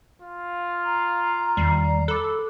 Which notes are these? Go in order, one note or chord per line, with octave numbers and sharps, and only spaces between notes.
F4
A#5
E2 D#3 G3 C7
A4 B5 D6 F#6